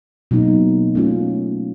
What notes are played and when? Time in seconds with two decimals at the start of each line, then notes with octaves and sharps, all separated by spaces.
0.31 B2 F#3 A#3 D#4
0.95 A3 C#4 F4